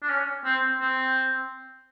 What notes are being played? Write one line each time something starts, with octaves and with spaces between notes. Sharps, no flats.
D4
C#4
C4
C4